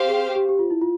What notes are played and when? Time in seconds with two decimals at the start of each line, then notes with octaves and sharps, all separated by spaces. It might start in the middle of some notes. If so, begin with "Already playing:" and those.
Already playing: C4 G4 C5 F5
0.08 G#4
0.36 G4
0.49 G4
0.59 F4
0.70 E4
0.81 F4